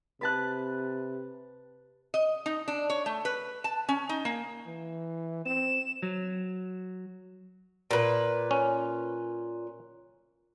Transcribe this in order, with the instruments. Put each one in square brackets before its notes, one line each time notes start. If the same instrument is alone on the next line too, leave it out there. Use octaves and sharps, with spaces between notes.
[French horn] C3 [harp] B4 A5 F#6
[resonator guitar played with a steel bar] D#5
D#4
D4
C#5
A3
B4
A5
C#4
D#4
A#3
[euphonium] E3
[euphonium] C4 [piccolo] E7
[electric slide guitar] F#3
[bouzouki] A#2 B4
[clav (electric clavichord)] C#4